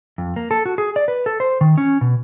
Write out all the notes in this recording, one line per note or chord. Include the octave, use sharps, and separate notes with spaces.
F2
A#3
A4
F#4
G#4
D5
B4
A4
C5
D#3
C#4
B2